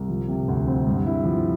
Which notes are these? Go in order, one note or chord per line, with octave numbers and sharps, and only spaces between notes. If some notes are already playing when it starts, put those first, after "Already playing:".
Already playing: C2
F3
C3
D2
C4
G2
E4
F3